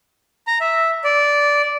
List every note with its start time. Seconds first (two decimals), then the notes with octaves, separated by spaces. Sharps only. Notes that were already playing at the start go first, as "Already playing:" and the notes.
0.47 A#5
0.61 E5
1.04 D5